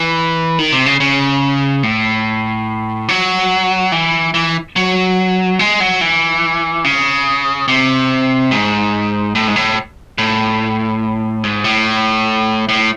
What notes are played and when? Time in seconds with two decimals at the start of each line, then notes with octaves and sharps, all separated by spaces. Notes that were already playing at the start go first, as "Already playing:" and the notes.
Already playing: E3
0.59 D#3
0.72 C3
0.86 C#3
1.00 C#3
1.83 A2
3.09 F#3
3.92 E3
4.34 E3
4.76 F#3
5.59 G#3
5.80 F#3
6.01 E3
6.84 C#3
7.68 C3
8.51 G#2
9.35 A2
9.48 G#2
9.56 A2
10.18 A2
11.44 G#2
11.64 A2
12.69 A2